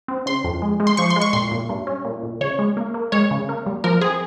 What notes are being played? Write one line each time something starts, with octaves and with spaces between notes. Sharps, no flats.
C4
C#3 C6
F2
G#3
G#3
C6
F3 C#6
C6
G#3
C#6
A#2 C6
A#2
G2
C#4
A#2
A#2
C#3 C#5
G#3
A#3
A#3
G#3 C#5
C#3
A#3
G3
F3 A#4
C4 G#4